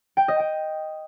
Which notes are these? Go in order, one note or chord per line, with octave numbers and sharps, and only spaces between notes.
G5
D#5
G5